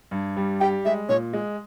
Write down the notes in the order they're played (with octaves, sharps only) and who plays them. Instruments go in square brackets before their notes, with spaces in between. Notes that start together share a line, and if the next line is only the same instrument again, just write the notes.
[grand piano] G2
G3
[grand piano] G4 [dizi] G5
[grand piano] G#3 [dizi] E5
[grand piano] A#2 [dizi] C#5
[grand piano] G#3